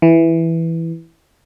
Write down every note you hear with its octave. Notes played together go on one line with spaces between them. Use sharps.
E3